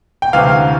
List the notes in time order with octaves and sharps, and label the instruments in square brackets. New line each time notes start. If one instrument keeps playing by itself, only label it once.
[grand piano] G5
D2 C3 E3 F5